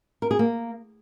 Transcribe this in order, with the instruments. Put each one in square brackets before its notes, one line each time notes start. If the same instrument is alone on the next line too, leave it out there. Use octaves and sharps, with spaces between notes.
[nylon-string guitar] A#4
G#4
A#3